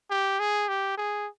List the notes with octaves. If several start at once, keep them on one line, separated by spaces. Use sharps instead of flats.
G4
G#4
G4
G#4